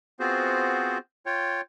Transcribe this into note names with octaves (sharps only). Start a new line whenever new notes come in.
B3 C4 F4 F#4 G#4 C5
F4 C#5 G5